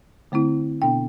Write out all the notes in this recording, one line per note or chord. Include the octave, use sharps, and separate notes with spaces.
D3 A3 C4 E4
B2 B3 D4 G5